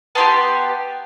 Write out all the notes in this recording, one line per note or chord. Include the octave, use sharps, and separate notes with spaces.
B3 E4 G4 A5 C6